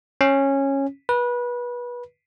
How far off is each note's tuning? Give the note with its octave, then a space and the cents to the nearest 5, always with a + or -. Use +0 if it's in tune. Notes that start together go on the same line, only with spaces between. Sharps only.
C#4 -15
B4 -25